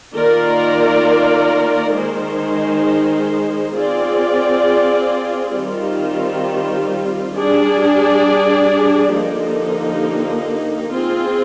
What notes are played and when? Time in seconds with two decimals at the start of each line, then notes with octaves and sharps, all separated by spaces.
0.14 D#3 A#3 F4 A#4 D5
1.93 D#3 G#3 D#4 G#4 C5
3.74 C4 F4 G#4 D5
5.53 D#3 G3 C4 F4
7.33 G3 D4 G#4 D5
9.13 D3 F3 A#3 D#4 G4
10.93 C4 F4 G#4